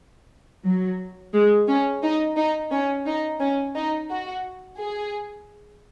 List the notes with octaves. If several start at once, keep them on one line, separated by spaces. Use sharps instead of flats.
F#3
G#3
C#4
D#4
D#4
C#4
D#4
C#4
D#4
F#4
G#4